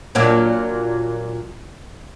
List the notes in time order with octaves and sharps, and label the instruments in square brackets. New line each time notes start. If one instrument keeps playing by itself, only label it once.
[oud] A#2 F#3 D4